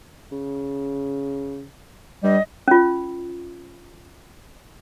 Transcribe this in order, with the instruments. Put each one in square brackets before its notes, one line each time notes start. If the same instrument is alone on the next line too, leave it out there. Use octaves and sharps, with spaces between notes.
[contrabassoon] C#3
[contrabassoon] G2 [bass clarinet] G3 [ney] D#5
[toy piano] C#4 F4